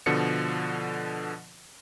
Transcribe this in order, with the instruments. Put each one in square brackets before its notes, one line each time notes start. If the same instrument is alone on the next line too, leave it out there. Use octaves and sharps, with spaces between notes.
[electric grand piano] B2 D3 F3 C#7